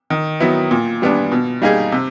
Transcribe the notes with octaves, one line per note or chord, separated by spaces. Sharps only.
D#3
F#3 B3 E4
A#2
G3 B3 D4
B2
G3 A#3 D#4 G#4
C3